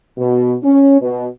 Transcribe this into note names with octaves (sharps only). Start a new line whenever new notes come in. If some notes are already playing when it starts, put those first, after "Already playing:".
B2
C#4
B2